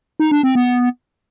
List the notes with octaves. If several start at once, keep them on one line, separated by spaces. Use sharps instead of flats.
D#4
D4
C4
B3